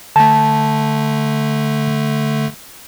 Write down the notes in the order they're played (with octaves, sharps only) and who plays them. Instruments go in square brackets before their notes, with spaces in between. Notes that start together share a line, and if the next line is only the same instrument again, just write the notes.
[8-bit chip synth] D3 A3 [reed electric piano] A5